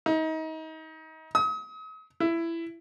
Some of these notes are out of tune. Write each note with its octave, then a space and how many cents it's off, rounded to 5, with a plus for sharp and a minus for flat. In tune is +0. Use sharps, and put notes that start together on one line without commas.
D#4 +30
D#6 +40
E4 +15